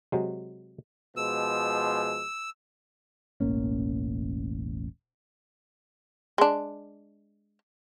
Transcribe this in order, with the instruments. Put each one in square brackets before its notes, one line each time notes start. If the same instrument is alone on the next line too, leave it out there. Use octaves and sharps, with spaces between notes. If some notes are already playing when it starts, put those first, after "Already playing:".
[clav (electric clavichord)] C3 F#3 G#3
[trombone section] B2 F3 G#3 [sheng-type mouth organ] E6
[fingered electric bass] E1 A1 A#3 C#4
[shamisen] G#3 D4